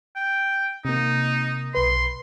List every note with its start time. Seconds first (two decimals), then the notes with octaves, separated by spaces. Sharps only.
0.16 G5
0.85 C3 A#3 D#4
1.75 B1 B4 C6